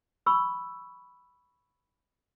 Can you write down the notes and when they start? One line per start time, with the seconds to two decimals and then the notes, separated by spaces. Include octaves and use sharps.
0.26 B5 C#6 E6